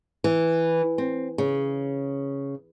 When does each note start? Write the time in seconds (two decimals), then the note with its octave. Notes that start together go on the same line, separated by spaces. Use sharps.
0.24 E3
0.98 C4
1.38 C#3